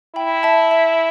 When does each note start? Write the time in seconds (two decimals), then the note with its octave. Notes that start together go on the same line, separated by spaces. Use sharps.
0.16 E4 G5 B5
0.43 E5 A5
0.71 E5